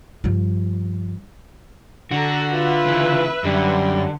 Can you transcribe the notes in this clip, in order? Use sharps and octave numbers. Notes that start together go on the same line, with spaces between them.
G2 F3
D3 F#4 A4 A#5
F4 B4 E5
C#3 E3
F#2 D3 G3